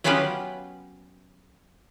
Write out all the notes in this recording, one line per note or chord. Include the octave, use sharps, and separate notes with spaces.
F#3 B3 C#4 F4 G4 B4